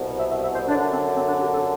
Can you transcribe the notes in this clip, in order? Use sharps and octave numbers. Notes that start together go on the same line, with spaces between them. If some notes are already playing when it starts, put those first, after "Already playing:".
Already playing: C2 B2
E5
E5
E5
C5
F#2 D3 D4
D4
C4
C4
D4
G4
A4